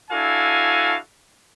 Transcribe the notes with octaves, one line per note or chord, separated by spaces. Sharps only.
D4 E4 F#4 A4 F5 G#5